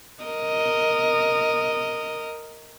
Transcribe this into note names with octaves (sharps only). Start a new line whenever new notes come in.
A#4 D#5